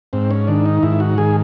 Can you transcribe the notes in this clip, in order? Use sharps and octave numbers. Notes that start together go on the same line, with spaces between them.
G#2 C4
C#4
D#3 D4
D#4
G#2 E4
F#4
D#3 G#4